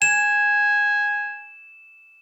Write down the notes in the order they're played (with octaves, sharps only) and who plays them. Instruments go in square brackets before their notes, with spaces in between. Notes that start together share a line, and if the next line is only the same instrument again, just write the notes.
[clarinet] G#5 [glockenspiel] E7